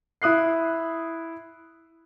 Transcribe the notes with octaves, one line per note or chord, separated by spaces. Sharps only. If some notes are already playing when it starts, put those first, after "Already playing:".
E4 D#6 F#6 C7